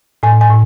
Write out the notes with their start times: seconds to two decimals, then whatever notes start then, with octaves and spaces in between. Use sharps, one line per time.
0.23 A2 G#5
0.41 G#5
0.50 A2